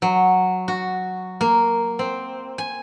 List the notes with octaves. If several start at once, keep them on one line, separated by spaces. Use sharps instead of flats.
F#3
F#4
A#3
C4
G#5